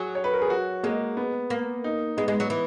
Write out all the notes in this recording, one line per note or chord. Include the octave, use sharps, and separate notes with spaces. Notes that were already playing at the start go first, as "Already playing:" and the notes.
Already playing: F#3 G#4
C#5
B4
A#4
G#4
F#4
G#3 A#3
B3
A#3
D#4
G#3 B3
G#3
F#3
E3